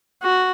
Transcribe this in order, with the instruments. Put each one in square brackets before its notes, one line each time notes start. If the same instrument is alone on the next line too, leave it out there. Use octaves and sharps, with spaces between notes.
[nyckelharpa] F#4